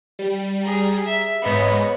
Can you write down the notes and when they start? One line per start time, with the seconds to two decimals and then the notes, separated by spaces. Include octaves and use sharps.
0.19 G3
0.63 G#4 A#5
1.05 E5
1.42 G#2 B3 C#5 D#5 B5